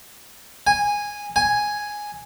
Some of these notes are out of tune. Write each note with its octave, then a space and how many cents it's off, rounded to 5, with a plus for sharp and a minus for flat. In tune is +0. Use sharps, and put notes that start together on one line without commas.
G#5 -10
G#5 +0